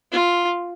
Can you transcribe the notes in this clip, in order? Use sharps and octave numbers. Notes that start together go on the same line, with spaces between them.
F4